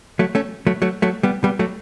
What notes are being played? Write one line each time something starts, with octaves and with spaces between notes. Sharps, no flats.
F#3 A3
A3 C#4
F#3 A3
F#3 A3
F#3 A3
G3 B3
G3 B3
F#3 A3